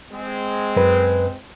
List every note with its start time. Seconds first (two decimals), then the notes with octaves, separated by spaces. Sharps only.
0.12 G#3 C4
0.76 F#2 B4